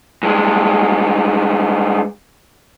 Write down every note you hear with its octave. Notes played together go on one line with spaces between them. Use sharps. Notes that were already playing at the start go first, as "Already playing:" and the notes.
G2 G#3